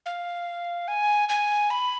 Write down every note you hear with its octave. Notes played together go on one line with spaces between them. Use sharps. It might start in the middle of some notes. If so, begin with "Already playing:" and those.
F5
G#5
G#5
B5